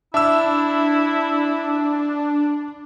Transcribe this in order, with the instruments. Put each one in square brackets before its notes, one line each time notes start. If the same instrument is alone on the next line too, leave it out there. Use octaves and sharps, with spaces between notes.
[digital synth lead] D4 [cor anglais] E4 [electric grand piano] E5 E6